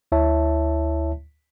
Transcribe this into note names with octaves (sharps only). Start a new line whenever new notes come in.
D2 E4 C#5 E5 A5